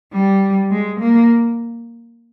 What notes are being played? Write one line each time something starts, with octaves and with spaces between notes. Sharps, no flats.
G3
G#3
A#3